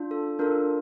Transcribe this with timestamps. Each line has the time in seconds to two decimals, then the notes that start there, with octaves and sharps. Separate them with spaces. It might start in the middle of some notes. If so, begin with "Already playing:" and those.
Already playing: D4 F4
0.11 A4
0.39 D4 F4 A4 A#4